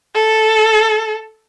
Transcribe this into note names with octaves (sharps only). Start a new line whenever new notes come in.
A4